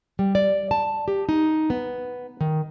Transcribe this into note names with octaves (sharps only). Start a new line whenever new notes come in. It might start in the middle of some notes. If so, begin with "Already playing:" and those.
G3
D5
A5
G4
D#4
B3
D#3